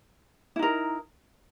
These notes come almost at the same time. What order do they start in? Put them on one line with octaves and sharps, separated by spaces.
E4 D#4 A#4